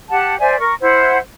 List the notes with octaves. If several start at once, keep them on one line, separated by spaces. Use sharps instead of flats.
G4 F#5 A5
C5 D5 E5 G#5
A#4 C#6
E4 C5 F#5